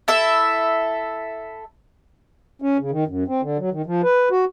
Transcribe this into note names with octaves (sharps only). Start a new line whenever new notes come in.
E4 A4 E5
C#4
C#3
D#3
F#2
C4
D3
F#3
D#3
F3
B4
F#4